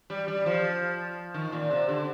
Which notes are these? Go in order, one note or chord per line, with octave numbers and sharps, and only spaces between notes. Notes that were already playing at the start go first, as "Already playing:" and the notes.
G3
G3
F3
D#3
A#2
C3
D3